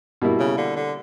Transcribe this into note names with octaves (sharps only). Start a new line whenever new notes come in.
B2 G3 A#3 E4
C#3
D3
D3